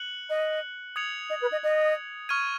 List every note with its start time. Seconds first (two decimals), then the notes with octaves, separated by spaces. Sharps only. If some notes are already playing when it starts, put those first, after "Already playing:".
Already playing: F#6 C#7 F#7
0.29 D#5
0.96 D#6 G#6 C#7 F7
1.29 D#5
1.41 B4
1.51 D#5
1.63 D#5
2.29 C#6 F6 G#6 D#7